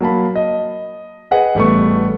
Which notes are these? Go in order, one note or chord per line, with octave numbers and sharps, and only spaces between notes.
F#3 A#3 A5 B5
D#5
G#4 B4 D#5 F#5 G#5
A1 G3 A3 B3 C#6